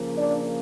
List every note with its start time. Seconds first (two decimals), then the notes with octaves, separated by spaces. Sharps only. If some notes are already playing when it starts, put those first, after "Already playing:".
Already playing: C#3 F3 A#3
0.15 D4 D5